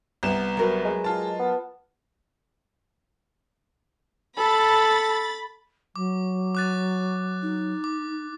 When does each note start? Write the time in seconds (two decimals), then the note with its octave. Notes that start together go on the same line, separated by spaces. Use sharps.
0.23 C2 B3 E7
0.57 F#3 A#4 B4
0.84 G#3
1.04 F4 A5
1.39 B3
4.37 A4 B5 A6
5.96 F#3 D6
6.55 D6 F#6 A6
7.42 D#4
7.84 D6